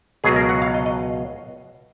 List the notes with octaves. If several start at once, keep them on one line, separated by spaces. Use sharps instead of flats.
C#2 B2 F#3 G#4
A#4
F#5
F5
D#5
D#5